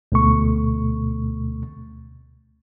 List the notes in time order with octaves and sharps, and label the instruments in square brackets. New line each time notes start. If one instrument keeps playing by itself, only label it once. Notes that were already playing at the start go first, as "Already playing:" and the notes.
[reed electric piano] D2 B2 A3 C#6